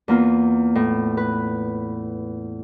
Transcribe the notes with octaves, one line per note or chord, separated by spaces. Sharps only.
E2 A#3 F4
A2
B4